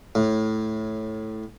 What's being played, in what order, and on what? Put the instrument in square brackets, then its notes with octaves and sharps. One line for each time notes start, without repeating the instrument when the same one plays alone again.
[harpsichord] A2